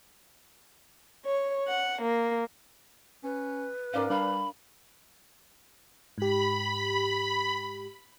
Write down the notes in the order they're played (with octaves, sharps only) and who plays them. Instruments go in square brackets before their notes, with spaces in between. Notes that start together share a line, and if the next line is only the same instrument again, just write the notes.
[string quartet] C#5
F#5
A#3
[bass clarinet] C#4 [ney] B4
[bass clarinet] G#2 [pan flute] C#4 [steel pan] A#4 D5 F5
[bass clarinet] G3 [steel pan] D4 F5 [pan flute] B5
[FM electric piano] G#2 G4 [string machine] B5